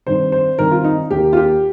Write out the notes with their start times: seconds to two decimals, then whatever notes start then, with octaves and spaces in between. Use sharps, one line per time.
0.06 G2 D#3 C4 C5
0.32 C5
0.59 G2 D#3 C4 A#4
0.71 F4
0.84 D#4
1.11 D#2 D#3 A#3 G4
1.33 F4
1.37 G4